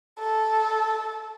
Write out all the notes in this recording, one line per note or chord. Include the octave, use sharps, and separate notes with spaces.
A4